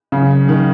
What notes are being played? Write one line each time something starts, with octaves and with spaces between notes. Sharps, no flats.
C#3 F#3
F#3
D#3 D#4